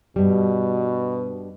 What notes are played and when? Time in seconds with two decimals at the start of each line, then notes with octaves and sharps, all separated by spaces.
0.16 G2 B2 G3